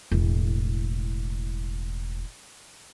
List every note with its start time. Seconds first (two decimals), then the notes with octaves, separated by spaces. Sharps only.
0.11 E1 A2